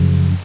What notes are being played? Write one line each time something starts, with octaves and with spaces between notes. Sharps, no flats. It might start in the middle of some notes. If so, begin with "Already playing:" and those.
Already playing: F#2 C#3 F3